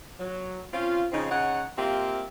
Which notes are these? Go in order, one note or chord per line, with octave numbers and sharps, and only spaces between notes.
F#3
C4 C#4 F4
C#3 F3 C4 D#4
C#3 D#4 C#5 F#5
A#3 C4 F4 G4 E5